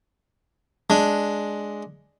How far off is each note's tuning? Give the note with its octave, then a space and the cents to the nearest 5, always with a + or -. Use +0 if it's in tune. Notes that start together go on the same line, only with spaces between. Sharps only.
G#3 +5 D4 +0